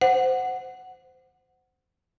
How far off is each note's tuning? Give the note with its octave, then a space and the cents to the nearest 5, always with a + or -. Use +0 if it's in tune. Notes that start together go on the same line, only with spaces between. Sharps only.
C5 -15 F#5 +5